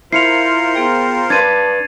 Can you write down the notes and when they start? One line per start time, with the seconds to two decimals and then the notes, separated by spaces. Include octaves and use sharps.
0.13 E4 F4 A#4 C5 C7 C#7 F7
0.75 B3 G#4 G5
1.30 D4 B4 A5 G#6 A6 D#7